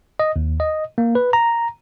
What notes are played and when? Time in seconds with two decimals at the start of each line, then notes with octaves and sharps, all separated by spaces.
0.20 D#5
0.36 D#2
0.60 D#5
0.98 A#3
1.15 B4
1.33 A#5